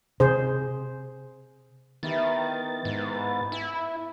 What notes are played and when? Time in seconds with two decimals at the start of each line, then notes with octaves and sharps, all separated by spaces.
0.20 C3 G#4 C5
2.03 D#3 B3 E4 G4 A6
2.85 G#2
3.15 B4
3.52 E4 G#5 D6